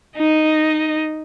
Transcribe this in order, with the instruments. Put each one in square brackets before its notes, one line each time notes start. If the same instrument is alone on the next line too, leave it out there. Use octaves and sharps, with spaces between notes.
[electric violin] D#4 D#5